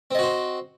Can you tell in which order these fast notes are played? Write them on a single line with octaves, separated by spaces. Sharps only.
C4 D#5 F#4 C5